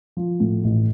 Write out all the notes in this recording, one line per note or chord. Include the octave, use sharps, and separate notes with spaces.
F3
A2
A1